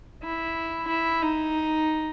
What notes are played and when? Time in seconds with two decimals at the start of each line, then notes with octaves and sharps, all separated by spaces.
0.23 E4
0.88 E4
1.23 D#4